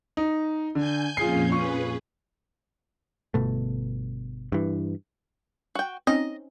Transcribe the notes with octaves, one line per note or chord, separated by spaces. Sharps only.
D#4
D3 G#5 G6
F2 A#2 C#4 F4 G#4 C7
F4 G#4 B4 C#6
G1 B2 A3
G2 E3
F#4 G5
C4 C#4 D#4 D#5